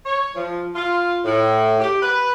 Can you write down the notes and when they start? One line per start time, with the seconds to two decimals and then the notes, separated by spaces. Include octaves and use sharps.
0.05 C#5
0.36 F3
0.75 F4
1.25 A2
1.80 G4
2.02 B4